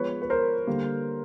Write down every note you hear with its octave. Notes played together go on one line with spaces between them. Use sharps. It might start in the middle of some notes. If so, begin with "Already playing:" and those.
Already playing: F3 G#3 B3 B4 C#5
B4
A#4 C5
D3 G3 A#3